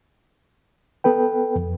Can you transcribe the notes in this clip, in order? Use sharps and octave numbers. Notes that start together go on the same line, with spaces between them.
B3 A4 B4 G5
F2